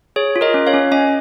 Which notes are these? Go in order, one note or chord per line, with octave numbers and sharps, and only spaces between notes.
G#4 C#5
F4
A#4 D#5
C#4
C#5 F5
C#4
C#4 D#5 G#5